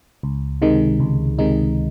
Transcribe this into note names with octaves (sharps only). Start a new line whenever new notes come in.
C#2
C3 D#3 G#3 D#4
C#2
C3 D#3 G#3 D#4